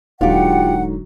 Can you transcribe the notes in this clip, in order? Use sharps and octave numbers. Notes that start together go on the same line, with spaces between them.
D#1 G#2 D3 F#3 F4 G4 F#5